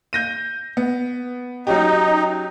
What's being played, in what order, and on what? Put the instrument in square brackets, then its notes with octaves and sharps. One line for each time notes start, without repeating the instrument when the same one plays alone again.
[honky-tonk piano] G6 A#6 D#7
B3
[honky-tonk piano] F#3 C#4 G4 [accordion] D#4